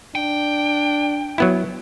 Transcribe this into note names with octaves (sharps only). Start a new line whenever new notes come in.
D4 G5
F#3 B3 E4